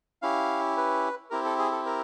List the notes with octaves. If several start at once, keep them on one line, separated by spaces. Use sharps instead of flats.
C#4 E4 G4 F5
B4
C4 E4 G4 A#4
A4
G#4
A4
A#4